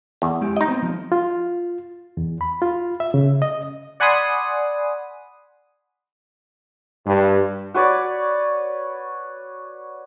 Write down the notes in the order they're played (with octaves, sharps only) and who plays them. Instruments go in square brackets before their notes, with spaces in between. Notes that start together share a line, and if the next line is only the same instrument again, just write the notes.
[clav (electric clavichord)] E2
[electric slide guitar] G#3 E4 G4
[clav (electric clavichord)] D#4 D#5
[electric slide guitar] B3 C4
F3
[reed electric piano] F4
E2
B5
F4
E5
C#3
D#5
[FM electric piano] D5 F#5 G#5 B5 C6 D#6
[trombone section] G2
[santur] F#4 B4 C#5 D5